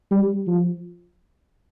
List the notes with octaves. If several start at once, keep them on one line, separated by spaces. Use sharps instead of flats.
G3
F3